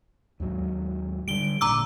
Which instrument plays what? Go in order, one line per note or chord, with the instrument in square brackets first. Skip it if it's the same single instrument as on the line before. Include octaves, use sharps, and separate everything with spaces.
[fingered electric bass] D#2 G#2 F#3
[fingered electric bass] D3 G3 [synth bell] D7 G7
[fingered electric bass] G#1 A#2 D3 [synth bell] A#5 D6 E6